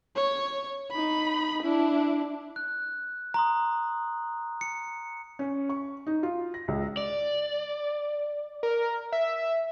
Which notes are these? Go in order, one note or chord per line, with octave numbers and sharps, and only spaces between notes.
C#5
D#4 B5
D4 E4
F#6
A#5 C6 D#6
C#7
C#4
C#6
D#4
F4
A#6
C#2
D5
A#4
E5